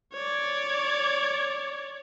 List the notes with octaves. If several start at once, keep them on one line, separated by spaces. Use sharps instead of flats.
C#5 D5